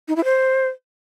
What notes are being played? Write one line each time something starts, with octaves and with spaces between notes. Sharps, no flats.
D#4
E4
C5